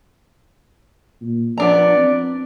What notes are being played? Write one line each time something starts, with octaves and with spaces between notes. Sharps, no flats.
A#2
F3 B3 D4 D5 A#5
C4